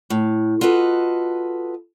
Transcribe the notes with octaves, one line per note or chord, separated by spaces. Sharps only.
A2
F4 F#4 A4 B4 D#5